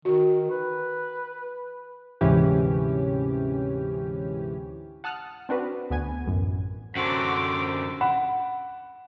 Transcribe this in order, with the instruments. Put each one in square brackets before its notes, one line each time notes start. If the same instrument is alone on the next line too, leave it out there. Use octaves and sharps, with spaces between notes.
[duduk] D#3 [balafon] F#4
[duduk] B4
[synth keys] D2 G#2 C3 E3 C#4 G4
[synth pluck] F#5 A5 D#6 F6 F#6
C4 D4 F#4 B4
D2 B3 G#5 G#6
A1 F#2
[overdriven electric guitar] F#2 D3 [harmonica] A3 C4 F#4 [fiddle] D6
[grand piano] F#5 B5 E7